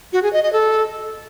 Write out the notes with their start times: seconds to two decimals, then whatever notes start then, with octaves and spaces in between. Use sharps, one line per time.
0.13 F#4
0.23 G#4
0.33 D#5
0.43 D#5
0.53 A4